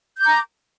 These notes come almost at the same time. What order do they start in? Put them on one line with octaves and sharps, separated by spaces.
G6 D6 A#5